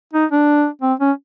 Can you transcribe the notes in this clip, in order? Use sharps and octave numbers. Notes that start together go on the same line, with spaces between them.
D#4
D4
C4
C#4